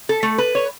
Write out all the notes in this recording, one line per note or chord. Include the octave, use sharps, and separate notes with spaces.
A4
A3
B4
C#5